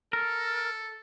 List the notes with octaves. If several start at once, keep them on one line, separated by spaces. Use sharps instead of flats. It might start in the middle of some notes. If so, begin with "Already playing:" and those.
A4 A#4